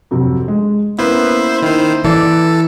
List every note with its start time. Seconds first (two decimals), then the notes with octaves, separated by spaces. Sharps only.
0.11 F2 C3 F#3
0.48 G#3
0.99 A#3 B3 C#4 E4 C5
1.62 D#3 E4 C5
2.04 E3 A4 D5